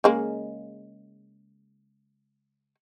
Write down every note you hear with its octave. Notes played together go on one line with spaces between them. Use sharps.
C#3 G#3 A#3